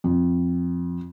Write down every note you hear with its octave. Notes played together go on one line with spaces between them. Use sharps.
F2